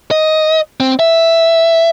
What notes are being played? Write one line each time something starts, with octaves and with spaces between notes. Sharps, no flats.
D#5
C4
E5